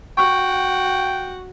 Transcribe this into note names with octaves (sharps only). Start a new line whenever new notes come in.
F#4 F#5 G5 C#6